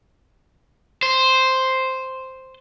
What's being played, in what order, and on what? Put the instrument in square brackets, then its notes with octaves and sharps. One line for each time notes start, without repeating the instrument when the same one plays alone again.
[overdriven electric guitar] C5